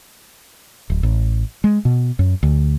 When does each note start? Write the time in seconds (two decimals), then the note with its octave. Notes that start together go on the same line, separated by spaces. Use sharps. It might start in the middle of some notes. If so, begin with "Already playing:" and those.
0.90 D1
1.03 A1
1.64 G#3
1.85 B2
2.19 F#2
2.43 D2